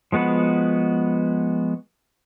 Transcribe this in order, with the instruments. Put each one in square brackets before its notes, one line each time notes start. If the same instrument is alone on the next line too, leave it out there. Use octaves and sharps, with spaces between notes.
[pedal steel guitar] F3 G#3 B3 F#4 B4